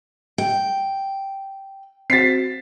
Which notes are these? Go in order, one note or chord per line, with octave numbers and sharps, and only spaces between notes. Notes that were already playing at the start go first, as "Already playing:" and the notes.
G5
C4 F#4 A6 B6 C7